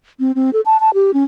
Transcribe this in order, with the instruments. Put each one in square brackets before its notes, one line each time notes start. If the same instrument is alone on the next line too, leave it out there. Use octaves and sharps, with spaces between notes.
[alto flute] C4
C4
A4
A5
A5
G4
C#4